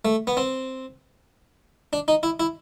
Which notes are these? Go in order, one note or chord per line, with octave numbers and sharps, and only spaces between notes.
A3
B3
C4
D4
D#4
E4
E4